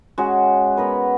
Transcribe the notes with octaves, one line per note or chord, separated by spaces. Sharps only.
G#3 C#4 F#4
B3 A#4 B4